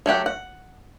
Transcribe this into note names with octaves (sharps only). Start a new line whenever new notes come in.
F#3 A3 G4 F#5
F#5